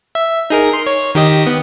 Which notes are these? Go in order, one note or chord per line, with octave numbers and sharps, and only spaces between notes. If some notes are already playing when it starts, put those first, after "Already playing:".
E5
D#4 G#4 A#4
C6
C#5
D#3 G4 D#5
B3